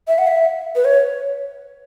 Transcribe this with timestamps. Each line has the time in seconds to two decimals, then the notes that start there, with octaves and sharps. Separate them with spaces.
0.08 E5
0.18 F#5
0.27 E5
0.75 B4
0.85 C#5